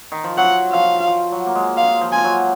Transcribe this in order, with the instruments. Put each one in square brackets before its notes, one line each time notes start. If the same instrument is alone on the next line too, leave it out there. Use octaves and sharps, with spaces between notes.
[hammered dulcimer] D#3
F3
[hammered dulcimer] F#3 [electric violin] F#5
[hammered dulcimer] F3 [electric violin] F5
[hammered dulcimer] F3
F#3
A#3
G#3
[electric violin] F5
[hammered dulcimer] F3
[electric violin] G#5
[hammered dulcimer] F#3